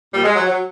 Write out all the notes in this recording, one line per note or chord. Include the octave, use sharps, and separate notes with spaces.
A#2 F3 G3
G#3
F#3
F#3